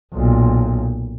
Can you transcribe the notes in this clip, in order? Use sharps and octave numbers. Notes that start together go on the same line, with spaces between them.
B1 A#2